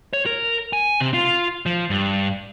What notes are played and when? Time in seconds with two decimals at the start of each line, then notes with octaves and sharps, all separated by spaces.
0.13 C#5
0.26 A#4
0.73 G#5
1.00 C3
1.14 F4
1.66 F3
1.90 G2